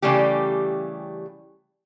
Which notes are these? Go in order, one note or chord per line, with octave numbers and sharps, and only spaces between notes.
C#3 E3 G3 A3 G4